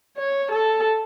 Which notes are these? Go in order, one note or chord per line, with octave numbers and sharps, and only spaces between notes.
C#5
A4